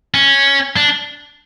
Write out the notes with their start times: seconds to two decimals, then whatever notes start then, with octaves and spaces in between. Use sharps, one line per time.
0.14 C#4
0.76 D4